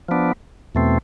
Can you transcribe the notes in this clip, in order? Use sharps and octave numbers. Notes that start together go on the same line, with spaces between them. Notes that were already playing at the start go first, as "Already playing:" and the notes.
F3 B3 D4
E2 B2 A3 C4